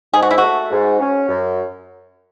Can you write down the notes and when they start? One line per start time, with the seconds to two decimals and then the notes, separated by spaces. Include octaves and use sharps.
0.13 G#2 G#4
0.22 F#4
0.31 E4
0.38 F#4
0.43 A3
0.71 G#2
0.99 C#4
1.29 F#2